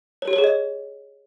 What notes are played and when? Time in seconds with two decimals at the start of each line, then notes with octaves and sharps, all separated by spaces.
0.22 C#5
0.28 G4
0.33 C#5
0.38 G#4
0.44 D#5